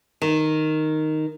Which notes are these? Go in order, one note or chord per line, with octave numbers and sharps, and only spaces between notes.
D#3